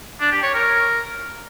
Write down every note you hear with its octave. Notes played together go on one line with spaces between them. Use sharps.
D4
G4
C#5
A#4